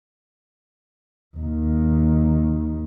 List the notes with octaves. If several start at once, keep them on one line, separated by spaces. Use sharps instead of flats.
D#2 D#3